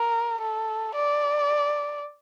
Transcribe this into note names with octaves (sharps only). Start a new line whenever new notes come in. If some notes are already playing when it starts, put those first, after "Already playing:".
Already playing: A#4
A4
D5